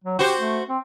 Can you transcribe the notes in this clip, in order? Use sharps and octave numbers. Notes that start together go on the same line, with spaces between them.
F#3
F#4 G4 C5
A3
C4